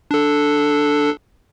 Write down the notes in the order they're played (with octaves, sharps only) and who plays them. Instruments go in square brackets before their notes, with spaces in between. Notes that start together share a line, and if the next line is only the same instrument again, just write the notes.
[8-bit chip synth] D4 A4